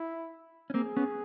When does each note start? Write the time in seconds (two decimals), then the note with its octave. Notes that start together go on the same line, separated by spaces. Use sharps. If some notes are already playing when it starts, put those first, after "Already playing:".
Already playing: E4
0.70 C#4
0.74 A#3 C4 G#4
0.97 B3 C#4